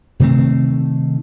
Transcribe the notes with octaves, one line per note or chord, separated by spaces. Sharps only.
C3 D#3 A3 C4